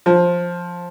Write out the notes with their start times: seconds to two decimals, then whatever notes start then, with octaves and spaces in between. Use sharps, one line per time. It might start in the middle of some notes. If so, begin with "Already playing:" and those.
0.06 F3